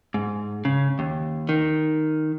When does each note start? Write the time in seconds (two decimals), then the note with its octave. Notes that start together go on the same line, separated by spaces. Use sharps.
0.14 G#2
0.65 C#3
0.99 D#2
1.49 D#3